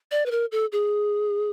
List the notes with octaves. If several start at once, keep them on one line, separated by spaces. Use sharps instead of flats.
D5
B4
A#4
A4
G#4